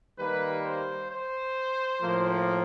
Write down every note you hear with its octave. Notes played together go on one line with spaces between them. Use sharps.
D#3 G3 A#3 B4
C5
C5
A2 F3 A#3